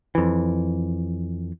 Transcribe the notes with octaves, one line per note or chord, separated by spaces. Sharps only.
F2 E3